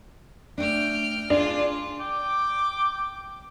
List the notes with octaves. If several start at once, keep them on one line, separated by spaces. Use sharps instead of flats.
A3 D4 G5 F6
D4 F4 G#4
G5 D6